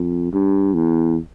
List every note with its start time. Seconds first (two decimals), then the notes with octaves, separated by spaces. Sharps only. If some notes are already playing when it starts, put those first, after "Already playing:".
Already playing: F2
0.33 G2
0.74 E2